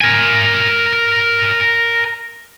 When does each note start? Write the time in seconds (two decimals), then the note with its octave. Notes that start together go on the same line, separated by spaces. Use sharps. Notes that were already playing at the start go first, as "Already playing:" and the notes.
0.01 A#4 G#5